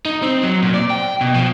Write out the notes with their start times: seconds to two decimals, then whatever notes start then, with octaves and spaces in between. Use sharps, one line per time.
0.05 D#4
0.22 C4
0.43 F#3
0.62 A#2
0.74 D5
0.90 G5
1.21 B2
1.34 F3